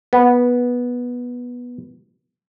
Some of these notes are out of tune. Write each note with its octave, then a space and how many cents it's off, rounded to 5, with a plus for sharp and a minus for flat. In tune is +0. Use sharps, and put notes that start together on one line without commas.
B3 -10